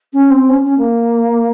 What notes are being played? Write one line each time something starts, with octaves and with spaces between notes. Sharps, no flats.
C#4
C4
C#4
C#4
A#3